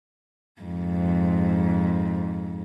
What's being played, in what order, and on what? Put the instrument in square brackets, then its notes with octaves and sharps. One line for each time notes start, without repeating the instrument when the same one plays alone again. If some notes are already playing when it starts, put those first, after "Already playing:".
[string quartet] F2 G#2